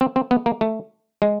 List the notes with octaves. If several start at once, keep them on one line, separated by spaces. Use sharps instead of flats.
C4
C4
B3
A#3
A3
G#3